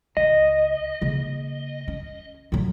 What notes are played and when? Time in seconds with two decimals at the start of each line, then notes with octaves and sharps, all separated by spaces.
0.17 C#2 D#5
1.02 C#3 A#3
1.88 C#4
2.52 D3 F#3